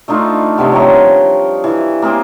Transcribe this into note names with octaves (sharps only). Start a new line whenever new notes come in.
A3 D4 D#4 F4
C3 F3 G3 B3
C#5 G5 A#5
E3
A#3 C4 G#4